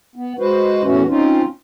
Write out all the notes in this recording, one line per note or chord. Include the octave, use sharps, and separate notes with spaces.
B3
G#3 F#4 B4 C5
E2 A2 E3 A3 C#4 F#4
C4 C#4 D#4 F4